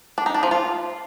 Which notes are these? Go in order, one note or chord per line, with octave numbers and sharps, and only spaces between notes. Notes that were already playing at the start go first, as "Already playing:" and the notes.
D4
D#4
D4
F3
F4